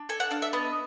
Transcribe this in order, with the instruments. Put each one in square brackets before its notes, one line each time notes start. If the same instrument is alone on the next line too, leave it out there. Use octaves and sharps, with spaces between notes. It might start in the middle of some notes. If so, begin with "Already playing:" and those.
Already playing: [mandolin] D4
A4 G#5
F#5
D4 F5
E5
B3 D#5